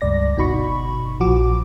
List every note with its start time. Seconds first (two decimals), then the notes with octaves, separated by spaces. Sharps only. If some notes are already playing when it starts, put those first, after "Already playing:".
0.01 C#2 G2 D5 A#6
0.37 G1 B2 D#4 F#4 B5 C#6
1.20 A#1 F3 F#4 D6